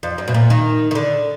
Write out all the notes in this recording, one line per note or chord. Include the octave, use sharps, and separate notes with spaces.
F2
F#2
B2
A#2
D#3
D#3
D3